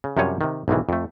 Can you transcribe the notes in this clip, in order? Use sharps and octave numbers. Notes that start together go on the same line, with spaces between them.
C#3
F#2 C3 F3 G3 C#5 G#5
C3 D#3
B1 G#2 C3 D#3 E3
F2 A3